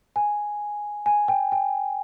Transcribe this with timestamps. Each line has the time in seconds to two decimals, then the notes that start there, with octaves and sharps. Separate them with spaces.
0.16 G#5
1.06 G#5
1.28 G5
1.52 G5